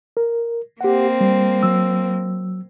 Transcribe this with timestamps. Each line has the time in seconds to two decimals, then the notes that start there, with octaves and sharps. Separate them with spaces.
0.17 A#4
0.81 A#3 C4 G4 F#5
1.21 G3
1.63 F#3 E6